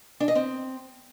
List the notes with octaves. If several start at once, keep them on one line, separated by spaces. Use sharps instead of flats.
D4
D#5
C4